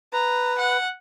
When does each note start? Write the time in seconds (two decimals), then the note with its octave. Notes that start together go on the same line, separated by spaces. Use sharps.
0.13 B4 A#5
0.59 F#5